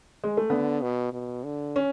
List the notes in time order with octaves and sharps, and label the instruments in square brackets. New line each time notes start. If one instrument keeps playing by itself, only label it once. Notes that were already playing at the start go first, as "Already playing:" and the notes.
[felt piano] G#3
A3
[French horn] D3 [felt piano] B3
[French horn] B2
B2
D3
[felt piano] C#4